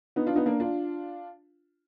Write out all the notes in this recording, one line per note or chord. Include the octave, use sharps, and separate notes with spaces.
B3 D#4
D4 F4
B3 D#4
A#3 D4
D4 F4